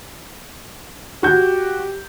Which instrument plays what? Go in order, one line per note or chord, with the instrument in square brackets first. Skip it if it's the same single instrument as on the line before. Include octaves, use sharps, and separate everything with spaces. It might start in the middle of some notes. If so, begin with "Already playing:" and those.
[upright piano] F#4 G6 [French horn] G4